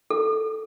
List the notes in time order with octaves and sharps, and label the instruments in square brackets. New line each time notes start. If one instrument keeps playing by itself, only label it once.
[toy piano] A4